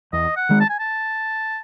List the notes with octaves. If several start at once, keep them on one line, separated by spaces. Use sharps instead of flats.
E2 D#5
F#5
D#3 G#3
A5
G#5
A5